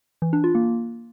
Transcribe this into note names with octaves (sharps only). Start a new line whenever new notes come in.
E3
D4
F4
A#3